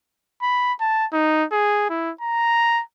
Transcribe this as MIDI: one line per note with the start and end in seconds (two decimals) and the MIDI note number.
0.42 0.73 83
0.80 1.06 81
1.13 1.44 63
1.52 1.86 68
1.90 2.11 64
2.21 2.82 82